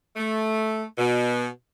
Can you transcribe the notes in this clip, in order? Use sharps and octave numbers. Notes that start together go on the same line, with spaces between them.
A3
B2